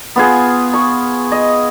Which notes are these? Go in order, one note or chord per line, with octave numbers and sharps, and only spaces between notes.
B3 F4 G#4
C#6
D#5